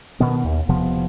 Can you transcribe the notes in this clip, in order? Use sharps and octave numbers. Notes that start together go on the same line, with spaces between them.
B2 D#3 B3
D#2
E1 C3 F3 B3